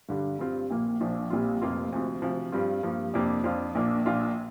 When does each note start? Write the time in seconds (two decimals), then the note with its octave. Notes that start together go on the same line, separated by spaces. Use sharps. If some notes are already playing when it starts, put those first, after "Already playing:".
0.09 G2 D3 G3
0.39 G2 G3 C4 F4
0.70 A#1 A#2 A#3
1.01 A#1 A#2 F3 D4
1.30 A#1 A#2 G3 C4 F4
1.62 F1 F2 C3 A#3 F4
1.92 D2 C3 F3 C4
2.22 D2 C3 F3
2.52 G2 G3 C4 F4
2.83 G2 F3 A#3
3.14 F2 C3 A#3 D4
3.44 F2 F3 D4 F4
3.75 A#1 A#2 A#3 D4
4.05 A#1 A#2 A#3 D4 F4